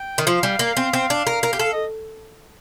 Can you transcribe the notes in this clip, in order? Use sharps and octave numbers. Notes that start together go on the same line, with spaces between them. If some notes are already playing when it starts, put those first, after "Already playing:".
Already playing: G5
D#3
F3 F5
G3
A#3
C4
C4
D4
A#4
A#4
G4
A4 F5
D#5